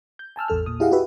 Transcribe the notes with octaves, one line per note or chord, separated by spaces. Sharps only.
G6
G#5 A5 E6 F6
A1 E2 A4 F6
A#2 D#6
E4 G4 G#4 D#5 F5 F#5
F#4 G4 B4 E5